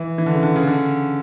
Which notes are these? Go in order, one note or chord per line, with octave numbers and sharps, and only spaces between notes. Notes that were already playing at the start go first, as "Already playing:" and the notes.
Already playing: E3
E3
D3
C#3
D3
C#3
D3